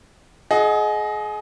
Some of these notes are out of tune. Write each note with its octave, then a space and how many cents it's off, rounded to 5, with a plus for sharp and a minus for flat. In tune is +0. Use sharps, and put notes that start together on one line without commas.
G#4 +30 D#5 +0 F#5 +0